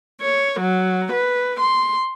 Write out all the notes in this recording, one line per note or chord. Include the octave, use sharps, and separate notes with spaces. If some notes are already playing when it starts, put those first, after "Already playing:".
C#5
F#3
B4
C6